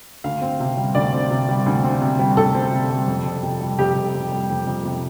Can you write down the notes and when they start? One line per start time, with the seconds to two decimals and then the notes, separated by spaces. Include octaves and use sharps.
0.24 D2 F5
0.42 C4
0.60 C3
0.77 G3
0.95 D2 D5
1.13 C4
1.31 C3
1.49 G3
1.66 D2
1.84 C4
2.01 C3
2.19 G3
2.37 D2 A4
2.55 C4
2.72 C3
2.90 G3
3.08 F2
3.26 F2
3.43 C3
3.60 G3
3.79 F2 G4
3.96 F2
4.14 C3
4.32 G3
4.49 F2
4.67 F2
4.85 C3